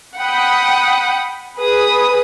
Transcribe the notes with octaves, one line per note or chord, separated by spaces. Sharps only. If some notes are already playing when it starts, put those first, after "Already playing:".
F#5 G5 B5 D#6
G#4 B4 D#6